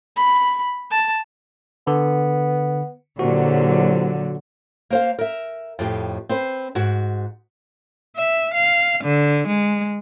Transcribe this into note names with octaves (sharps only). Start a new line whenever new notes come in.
B5
A5
D3 B3
C2 A#2 D3 F#3 F#4
A#3 C5 F5
A#4 E5
F2 A2 G4
C4 B4 C5
G#2 F#4
E5
F5
D3
G#3